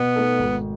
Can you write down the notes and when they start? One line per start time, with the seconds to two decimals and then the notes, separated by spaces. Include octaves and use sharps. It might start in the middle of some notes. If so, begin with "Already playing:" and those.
Already playing: B2 B3
0.16 A3 D#4 A4
0.39 G#1